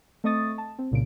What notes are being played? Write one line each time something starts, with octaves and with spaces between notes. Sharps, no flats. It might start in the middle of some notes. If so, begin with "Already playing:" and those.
A3 C4 D#5 C#6 D#6 A6
A5
C4
C2 A#2 C#3 D7